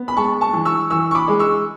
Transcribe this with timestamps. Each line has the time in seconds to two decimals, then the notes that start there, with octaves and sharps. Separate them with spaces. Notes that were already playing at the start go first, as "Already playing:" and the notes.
Already playing: B3
0.08 B5
0.16 G#3 A5 C#6
0.41 A5 C#6
0.53 E3
0.65 C#6 E6
0.90 E3 C#6 E6
1.11 C#6
1.15 B5 D6
1.28 G#3
1.39 C#6 E6